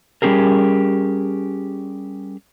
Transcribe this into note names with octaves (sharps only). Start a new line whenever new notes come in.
G3 G#3 C#4 G4 G#4 A#4